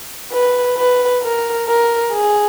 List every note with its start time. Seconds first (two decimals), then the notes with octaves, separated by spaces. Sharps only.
0.32 B4
0.77 B4
1.23 A#4
1.68 A#4
2.13 G#4